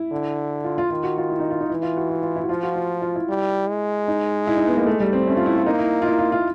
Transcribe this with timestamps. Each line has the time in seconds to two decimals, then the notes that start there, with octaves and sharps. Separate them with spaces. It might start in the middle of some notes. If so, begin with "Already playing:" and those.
Already playing: E4
0.11 D3
0.64 F4
0.78 F4
0.90 D#3 F4
1.04 F#4
1.18 F4
1.30 E4
1.40 D#4
1.51 F4
1.61 D#4
1.69 E3 E4
1.83 F4
1.97 F#4
2.10 F4
2.22 F4
2.36 E4
2.44 F#4
2.49 F3 F4
2.63 F#4
2.76 F4
3.02 F4
3.16 E4
3.29 G3
3.68 G#3
4.08 D#4
4.47 E4
4.57 D#4
4.67 B3
4.77 A#3
4.87 A3
5.00 G3
5.13 C4
5.26 A3 C#4
5.37 F4
5.46 E4
5.56 F4
5.66 A#3 D#4
5.79 E4
6.02 F4
6.06 E4
6.19 F4
6.32 F4